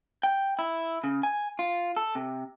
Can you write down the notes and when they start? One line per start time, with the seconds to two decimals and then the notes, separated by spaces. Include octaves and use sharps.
0.23 G5
0.59 E4
1.04 C#3
1.23 G#5
1.59 F4
1.96 A4
2.15 C3